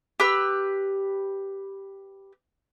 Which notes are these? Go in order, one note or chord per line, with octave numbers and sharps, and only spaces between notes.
G4 B4 E6